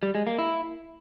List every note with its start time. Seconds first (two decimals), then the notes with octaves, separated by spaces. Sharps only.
0.03 G3
0.15 G#3
0.27 A#3
0.39 E4